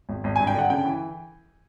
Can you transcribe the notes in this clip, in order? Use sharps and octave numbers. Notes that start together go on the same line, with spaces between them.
G#1
G#1
G#5
G2
G5
D3 F#5
C#3 G5
E3